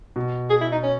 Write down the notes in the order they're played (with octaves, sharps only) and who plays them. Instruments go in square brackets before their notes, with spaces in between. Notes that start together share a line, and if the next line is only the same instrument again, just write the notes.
[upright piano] B2
[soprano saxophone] G#4
E4
D#4
C#4